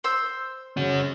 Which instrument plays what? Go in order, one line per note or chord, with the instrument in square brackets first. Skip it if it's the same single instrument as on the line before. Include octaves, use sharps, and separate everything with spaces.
[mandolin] C5 E6
[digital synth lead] C#3 [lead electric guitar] C#4 F#4